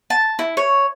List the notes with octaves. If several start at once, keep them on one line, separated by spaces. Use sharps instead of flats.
A5
E4
C#5